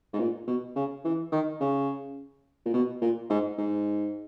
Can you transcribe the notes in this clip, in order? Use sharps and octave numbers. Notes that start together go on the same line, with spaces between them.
G#2
A#2
B2
C#3
E3
D#3
C#3
A#2
B2
A#2
G#2
G#2